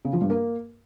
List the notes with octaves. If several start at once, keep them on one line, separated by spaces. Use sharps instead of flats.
C#3
F3
G2
A#3